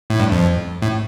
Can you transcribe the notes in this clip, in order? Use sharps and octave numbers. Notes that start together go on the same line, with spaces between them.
A2
G2
F2
A2